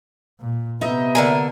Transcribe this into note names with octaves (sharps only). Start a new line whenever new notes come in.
A#2
C3 B3 D#4 D#5 E5
D3 A#3 G#5